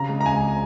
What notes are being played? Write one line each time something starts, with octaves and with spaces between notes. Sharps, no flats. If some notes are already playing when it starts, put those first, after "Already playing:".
Already playing: C#3 A#5
G#3
A#5
C#2 G#5